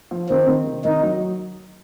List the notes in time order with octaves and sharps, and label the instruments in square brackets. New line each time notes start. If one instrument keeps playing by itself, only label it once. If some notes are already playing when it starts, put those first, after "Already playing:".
[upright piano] F3
[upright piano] D#3 [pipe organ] C4
[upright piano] D#3
C3
[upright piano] D#3 [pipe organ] D#4
[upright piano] F#3